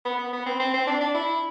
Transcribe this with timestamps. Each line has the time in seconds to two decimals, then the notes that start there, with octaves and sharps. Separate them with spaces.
0.05 B3
0.19 B3
0.33 B3
0.46 C4
0.60 C4
0.74 C4
0.87 D4
1.00 D4
1.15 E4